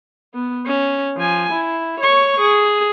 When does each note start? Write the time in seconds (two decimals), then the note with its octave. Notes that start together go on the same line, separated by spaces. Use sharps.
0.34 B3
0.66 C#4
1.17 F3 G#5
1.52 E4
2.00 C#5 C#6
2.40 G#4